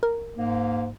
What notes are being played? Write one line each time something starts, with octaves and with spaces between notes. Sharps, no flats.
A#4
G#2 A#3